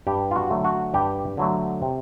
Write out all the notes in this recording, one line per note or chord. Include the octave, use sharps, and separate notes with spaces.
G2 G4
F4
F#4
D3 F#3 A3
F#4
G2 G4
D3 F#3 A3
C3